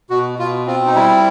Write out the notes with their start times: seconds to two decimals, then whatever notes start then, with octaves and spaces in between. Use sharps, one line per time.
0.10 B2 F#4
0.39 B2 F4
0.67 C4 F4
0.86 D#4
0.95 G3 E4